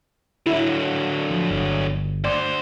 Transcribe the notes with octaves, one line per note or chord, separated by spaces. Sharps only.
D3 F#3 E4
F3
G1
D2 C5 D5